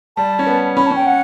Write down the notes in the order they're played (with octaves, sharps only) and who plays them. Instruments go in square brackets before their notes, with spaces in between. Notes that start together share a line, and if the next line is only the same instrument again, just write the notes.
[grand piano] G3 [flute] A5
[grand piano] C#4
B3
[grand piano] C#4 [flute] B5
[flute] A5
[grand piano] C#4 [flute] G5
[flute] F#5